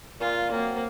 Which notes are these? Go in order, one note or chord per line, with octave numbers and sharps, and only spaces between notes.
A#2 F4
F#3 A#3 C4